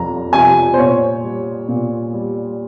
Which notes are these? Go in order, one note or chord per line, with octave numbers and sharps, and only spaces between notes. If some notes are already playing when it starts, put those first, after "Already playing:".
Already playing: F2 C3 F3 A#5
C3 F3 G#5
C5
A#2 C#5
G3
A#2
G3